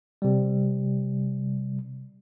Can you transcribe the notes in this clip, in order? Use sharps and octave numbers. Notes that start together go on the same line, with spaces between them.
C3 G3